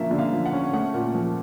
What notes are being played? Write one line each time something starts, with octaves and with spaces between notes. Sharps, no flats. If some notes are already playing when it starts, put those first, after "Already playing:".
Already playing: D3 F3 A#3 C#4 E5
D3
F5
F3
F#5
C#4
A3 F#5
A#2
F3